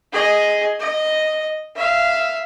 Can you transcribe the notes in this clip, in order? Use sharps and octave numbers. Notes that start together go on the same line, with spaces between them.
G#4 D#5
D#5
E5 F5